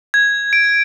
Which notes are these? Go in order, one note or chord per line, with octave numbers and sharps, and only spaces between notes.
G#6
D7